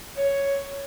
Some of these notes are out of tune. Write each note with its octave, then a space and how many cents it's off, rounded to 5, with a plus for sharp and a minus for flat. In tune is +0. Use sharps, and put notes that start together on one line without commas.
C#5 +5